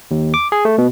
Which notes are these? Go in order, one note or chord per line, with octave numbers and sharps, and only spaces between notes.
D#2
D6
G#4
A3
B2